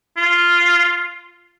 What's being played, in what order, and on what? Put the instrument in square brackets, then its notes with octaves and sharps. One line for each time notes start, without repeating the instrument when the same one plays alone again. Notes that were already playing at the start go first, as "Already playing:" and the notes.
[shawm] F4